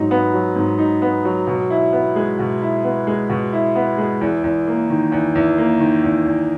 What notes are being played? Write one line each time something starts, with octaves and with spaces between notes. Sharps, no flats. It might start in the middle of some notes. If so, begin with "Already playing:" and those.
Already playing: G#2 F#3 D#4
B3
F#3
G#2
D#4
B3
F#3
B2
E4
B3
G#3
B2
E4
B3
G#3
B2
E4
B3
G#3
E2
E2
A#3
D#3
E2
E2
A#3
D#3
E2
E2